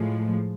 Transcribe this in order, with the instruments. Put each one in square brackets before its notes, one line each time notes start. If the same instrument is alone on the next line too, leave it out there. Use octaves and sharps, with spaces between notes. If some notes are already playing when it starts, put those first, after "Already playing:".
Already playing: [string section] A2 F3 G#3